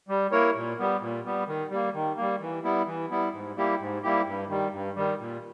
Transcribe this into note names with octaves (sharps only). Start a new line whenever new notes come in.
G3
A#3 E4 A#4 C#5
A#2
G3 B3
A#2
G3 B3
D#3
G3 A#3
D#3
G3 A#3
E3
G3 B3 E4
E3
G3 B3 E4
G#2
G3 A#3 E4 G4
G#2
G3 A#3 E4 G4
G2
D#3 G3
G2
D#3 G3
A#2